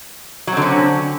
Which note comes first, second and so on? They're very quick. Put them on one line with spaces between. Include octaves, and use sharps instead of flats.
F#3 C4 D3 C#4